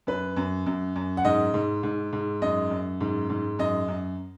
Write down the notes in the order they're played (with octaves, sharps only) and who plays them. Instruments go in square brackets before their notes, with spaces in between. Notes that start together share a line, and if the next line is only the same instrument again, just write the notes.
[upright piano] F#2 B4
F#2
F#2
F#2
F#5
G#2 D#5
G#2
G#2
G#2
F#2 D#5
F#2
G#2
G#2
F#2 D#5
F#2